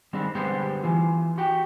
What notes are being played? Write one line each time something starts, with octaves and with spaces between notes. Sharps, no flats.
D#3 G3 G#3 C4 D4
D3 G3 G#3 B3 G4 C5
E3 F4
F#4 G4 G5